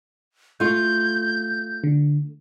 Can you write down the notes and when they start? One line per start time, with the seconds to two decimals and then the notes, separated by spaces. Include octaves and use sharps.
0.60 A3 F4 G6
1.84 D3